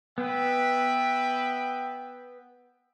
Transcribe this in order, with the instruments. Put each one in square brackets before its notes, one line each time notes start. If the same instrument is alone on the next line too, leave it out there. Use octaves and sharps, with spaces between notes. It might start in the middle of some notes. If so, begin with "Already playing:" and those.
[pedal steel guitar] B3 [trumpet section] B4 E5 G5